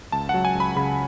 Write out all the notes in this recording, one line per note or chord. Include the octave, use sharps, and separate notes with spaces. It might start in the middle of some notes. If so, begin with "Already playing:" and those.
C#2 A5
F#3 F#5
G#5
C#2
B5
C#3 B5